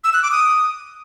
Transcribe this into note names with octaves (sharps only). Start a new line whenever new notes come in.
E6
F#6
D6
D#6